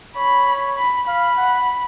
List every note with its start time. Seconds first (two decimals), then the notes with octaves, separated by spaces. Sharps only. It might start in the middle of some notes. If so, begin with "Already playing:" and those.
0.16 C#5 B5
0.77 B5
1.07 F5 B5
1.37 F#5